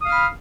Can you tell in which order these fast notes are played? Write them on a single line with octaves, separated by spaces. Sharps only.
D#6 F5 F6 B5